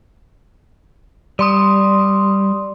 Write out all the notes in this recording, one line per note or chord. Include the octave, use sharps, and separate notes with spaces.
G3 D5 C6 D#6